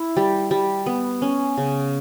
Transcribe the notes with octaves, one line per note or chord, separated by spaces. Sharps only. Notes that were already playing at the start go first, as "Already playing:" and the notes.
Already playing: E4
G3
G3
B3
C#4
C#3